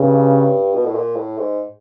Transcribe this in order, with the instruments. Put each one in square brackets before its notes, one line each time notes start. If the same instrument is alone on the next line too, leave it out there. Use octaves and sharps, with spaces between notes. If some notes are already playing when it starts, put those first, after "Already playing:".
Already playing: [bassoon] G2 [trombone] C#3
[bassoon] B2
A2
A#2
A2
G#2